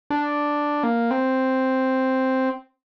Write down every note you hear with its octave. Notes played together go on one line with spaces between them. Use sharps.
D4
A#3
C4